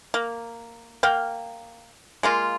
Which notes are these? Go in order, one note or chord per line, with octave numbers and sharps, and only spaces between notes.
A#3
A#3 F5 G5
G#3 A#3 F4